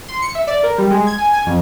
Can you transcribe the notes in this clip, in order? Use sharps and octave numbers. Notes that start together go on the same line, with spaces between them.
C6
C#7
E5
D5
A#4
G3
G#3
G#6
G#5
G#5
F2